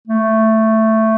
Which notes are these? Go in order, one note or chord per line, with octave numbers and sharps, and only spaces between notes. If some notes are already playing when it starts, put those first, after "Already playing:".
A3